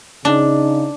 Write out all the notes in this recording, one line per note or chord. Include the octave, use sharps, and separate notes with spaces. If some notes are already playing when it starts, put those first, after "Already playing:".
C#3 D4 D#4